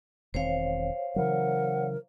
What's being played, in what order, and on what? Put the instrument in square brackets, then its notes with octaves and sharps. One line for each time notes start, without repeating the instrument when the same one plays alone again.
[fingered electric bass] E1 D#3 C4 [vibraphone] C5 C#5 F5
[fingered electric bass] C#3 E3 F#3 [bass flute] A#4 [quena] F#5